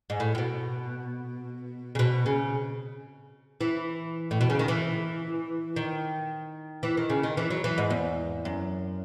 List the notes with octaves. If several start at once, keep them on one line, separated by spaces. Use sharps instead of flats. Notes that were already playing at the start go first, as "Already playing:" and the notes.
G#2
A2
A2
B2
C#3
B2
C#3
E3
A2
B2
C#3
D#3
E3
D#3
E3
D#3
C#3
D#3
E3
F#3
E3
G#2
E2
F#2